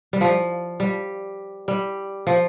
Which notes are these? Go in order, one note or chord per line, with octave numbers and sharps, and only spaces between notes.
G3
F3
G3
G3
F3